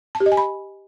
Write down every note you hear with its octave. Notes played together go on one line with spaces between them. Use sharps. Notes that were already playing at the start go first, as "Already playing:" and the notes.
A5
G4
D#5
G#5
B5